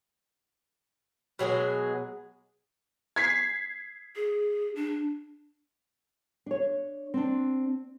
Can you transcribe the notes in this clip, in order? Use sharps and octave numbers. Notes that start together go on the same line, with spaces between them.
B2 F#3 G#3 G#4
G#6 B6 C7
G#4
D4
D4 C#5
C4 D4